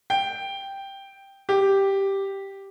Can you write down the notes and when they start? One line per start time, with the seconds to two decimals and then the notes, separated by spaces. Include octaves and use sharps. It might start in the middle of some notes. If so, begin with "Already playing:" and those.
0.10 G5
1.49 G4